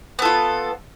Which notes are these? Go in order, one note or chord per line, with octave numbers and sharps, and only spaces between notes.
B3 F4 A4